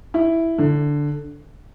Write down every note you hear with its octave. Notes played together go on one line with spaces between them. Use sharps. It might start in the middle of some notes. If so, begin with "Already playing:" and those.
E4
D3